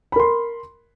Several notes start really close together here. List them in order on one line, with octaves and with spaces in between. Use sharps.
B5 A#4 C6